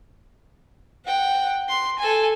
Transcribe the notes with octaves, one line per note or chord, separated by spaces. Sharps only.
F#5 G5
C6
A4 G#5